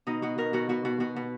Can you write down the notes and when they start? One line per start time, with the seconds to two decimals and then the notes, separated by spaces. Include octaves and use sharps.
0.07 B2 D#4
0.22 B2 F#4
0.38 B2 A#4
0.53 B2 F#4
0.69 B2 F#4
0.85 B2 F#4
1.00 B2 F#4
1.16 B2